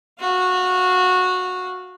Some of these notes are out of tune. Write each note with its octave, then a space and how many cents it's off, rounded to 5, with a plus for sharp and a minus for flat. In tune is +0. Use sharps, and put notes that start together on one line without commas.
F#4 -15 F5 +0